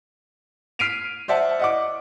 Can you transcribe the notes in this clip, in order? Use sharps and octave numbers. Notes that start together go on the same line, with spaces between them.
F6 B6 C7 D7 D#7 F7
C5 D5 E5 F#5 A5
D#5 F#5 D6